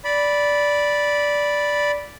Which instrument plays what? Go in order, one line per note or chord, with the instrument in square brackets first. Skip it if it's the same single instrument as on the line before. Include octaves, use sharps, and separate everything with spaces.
[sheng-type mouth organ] D5 B5